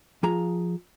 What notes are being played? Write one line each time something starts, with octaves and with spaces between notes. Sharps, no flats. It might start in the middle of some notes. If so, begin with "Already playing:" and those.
F3 G#4 A#5